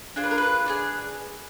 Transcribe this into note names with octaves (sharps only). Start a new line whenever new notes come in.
D4 F4 G#4 C5
B4
A#4
B4
D4 F4 G#4